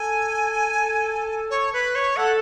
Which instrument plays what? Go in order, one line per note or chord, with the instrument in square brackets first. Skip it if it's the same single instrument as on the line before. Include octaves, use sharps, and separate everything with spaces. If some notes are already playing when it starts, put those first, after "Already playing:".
Already playing: [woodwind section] A4 [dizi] G#5
[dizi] C#5
B4
C#5
[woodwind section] A4 [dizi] F#5